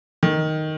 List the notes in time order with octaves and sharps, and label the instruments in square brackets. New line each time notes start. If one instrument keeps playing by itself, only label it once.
[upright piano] D#3